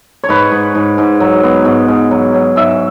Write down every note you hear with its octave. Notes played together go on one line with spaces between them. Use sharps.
C#5
G#2 B4
G#2
G#2
G#2
F#3
B3
G#2
G#2
F#3
F#3
G#2 E5